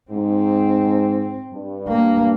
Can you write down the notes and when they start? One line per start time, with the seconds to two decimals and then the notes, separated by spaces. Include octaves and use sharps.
0.11 G#2 C4
1.52 G2
1.88 A#3